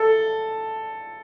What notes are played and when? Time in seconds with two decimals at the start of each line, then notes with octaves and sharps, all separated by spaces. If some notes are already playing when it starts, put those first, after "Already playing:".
Already playing: A4